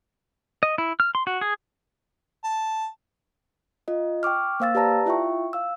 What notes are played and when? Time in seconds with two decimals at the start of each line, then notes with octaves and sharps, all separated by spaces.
0.63 D#5
0.78 E4
1.00 F6
1.15 C6
1.27 F#4
1.41 G#4
2.44 A5
3.88 F4 D#5
4.23 G5 C#6 D6 F6
4.60 A#3 C5 F5 E6 A6
4.75 G4 B4 D5 A5 A#5 A#6
5.06 E4 F4 E5 G5 C#6
5.53 F5 E6